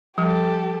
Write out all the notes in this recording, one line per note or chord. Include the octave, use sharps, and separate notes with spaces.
F3 G3 G4 A4